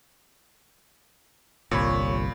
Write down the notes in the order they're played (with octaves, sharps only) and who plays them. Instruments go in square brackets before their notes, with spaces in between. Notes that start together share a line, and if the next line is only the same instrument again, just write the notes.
[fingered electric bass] G1 C2 [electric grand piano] A#2 B5 [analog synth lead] C#5